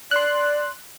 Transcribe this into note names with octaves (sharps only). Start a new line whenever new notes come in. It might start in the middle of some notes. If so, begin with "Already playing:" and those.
D5 C6 F#6